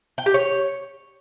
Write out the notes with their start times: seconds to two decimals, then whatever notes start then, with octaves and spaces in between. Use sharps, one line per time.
0.18 G5
0.26 G4
0.34 C#5